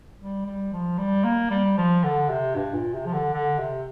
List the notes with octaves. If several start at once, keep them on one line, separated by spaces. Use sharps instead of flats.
G3
G3
F3
G3
A#3
G3
F3
D3
C3
G2
A#2
C3
F3
D3
D3
C3